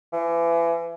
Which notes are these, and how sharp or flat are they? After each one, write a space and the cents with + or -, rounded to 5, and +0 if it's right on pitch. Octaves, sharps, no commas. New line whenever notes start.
E3 +30